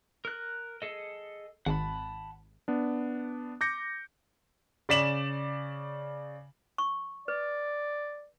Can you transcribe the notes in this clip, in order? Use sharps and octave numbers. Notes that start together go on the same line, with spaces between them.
A#4 F#6
G#4 A4 D#5
G#1 F#5 A5 B5
B3 D4
D6 G6 A#6 C#7
C#3 D5 B6 E7 F#7
C#6
B4 D5